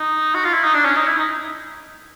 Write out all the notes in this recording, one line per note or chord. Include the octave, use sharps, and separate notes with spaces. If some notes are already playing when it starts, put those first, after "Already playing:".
Already playing: D#4
F#4
F4
E4
D#4
D4
C#4
D#4
E4
D#4